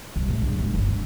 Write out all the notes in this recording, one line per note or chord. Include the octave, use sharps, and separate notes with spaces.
C2
A2
A#1 G2
A1 G#2
G1 C2
D3